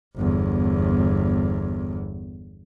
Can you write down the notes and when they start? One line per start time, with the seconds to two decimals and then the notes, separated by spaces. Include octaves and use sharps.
0.16 G1 E2